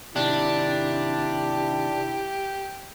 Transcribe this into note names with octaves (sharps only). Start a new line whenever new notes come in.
C3 D#3 D4 E4 G4